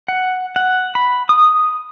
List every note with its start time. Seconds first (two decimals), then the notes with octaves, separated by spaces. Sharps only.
0.08 F#5
0.56 F#5
0.95 B5
1.29 D#6